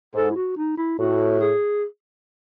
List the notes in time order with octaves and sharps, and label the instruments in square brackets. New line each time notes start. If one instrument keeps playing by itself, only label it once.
[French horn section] G#2 [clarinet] A4
[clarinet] E4
F#4
D#4
E4
[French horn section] A2 [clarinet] F#4
[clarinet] G#4